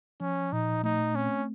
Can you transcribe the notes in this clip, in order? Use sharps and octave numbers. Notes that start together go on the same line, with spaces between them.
F3 C#4
A#2 D#4
A3 D#4
C4 C#4